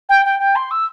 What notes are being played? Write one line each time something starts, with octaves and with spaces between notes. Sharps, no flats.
G5
G5
G5
C6
E6